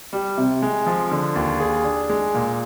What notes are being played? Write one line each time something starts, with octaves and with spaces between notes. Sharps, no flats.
G3
C3
G#3
F3
D3
D#2
G#4
D4
G#3
A#2